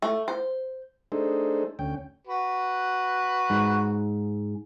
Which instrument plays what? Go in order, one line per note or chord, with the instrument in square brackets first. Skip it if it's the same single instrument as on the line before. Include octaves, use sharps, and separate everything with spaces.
[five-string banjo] A3
C5
[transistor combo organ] A3 D4 D#4 G#4 A4 C5
D2 C#4 G5
[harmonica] F#4 B4
[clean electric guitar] G#2